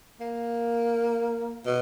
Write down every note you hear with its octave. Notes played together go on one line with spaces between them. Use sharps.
A#3
B2